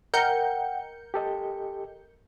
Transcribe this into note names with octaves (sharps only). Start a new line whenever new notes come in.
A#4 D#5 F#5 G5 G6 C#7
G4 A4 D#5